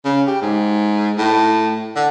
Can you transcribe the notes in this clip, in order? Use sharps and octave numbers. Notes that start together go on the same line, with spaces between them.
C#3
G4
G#2
A2
D3